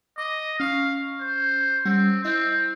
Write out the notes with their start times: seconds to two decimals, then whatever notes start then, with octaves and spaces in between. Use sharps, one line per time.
0.18 D#5 D6
0.60 C#4 F5 C#6 F6
1.20 C5
1.85 G3 C4 C#4 F#5
2.24 C4 E4 D#5